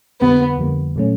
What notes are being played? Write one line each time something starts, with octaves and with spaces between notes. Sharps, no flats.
F2 D3 G3 A#3 B3
F2 D3 G3 A#3
A#2 F#3 A3 C#4